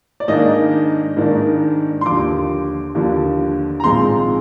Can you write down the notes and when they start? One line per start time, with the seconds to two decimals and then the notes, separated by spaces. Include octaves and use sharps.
0.20 D5
0.28 G#2 D#3 A#3 D4 D#5
1.17 G#2 D#3 A#3 D4
2.01 C6
2.06 D#2 D3 F3 D6
2.95 D#2 D3 F3
3.80 A#5
3.84 A#1 G#2 F3 G#3 C4 C6